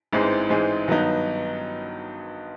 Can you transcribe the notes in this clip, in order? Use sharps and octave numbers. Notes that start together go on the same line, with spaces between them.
A1 G#2 E3 G#3 C4
A1 G#2 E3 G#3 C4
G2 D#3 F#3 B3 D#4